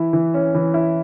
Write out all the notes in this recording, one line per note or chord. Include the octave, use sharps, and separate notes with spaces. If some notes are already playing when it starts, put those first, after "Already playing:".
Already playing: E3 E4
E3
C#4
E3
E4